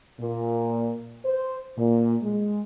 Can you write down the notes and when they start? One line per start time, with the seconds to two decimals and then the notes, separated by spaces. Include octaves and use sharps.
0.21 A#2
1.25 C5
1.77 A#2
2.22 G#3